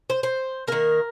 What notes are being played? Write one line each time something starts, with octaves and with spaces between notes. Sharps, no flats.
C5
C5
D#3 A#3 A#4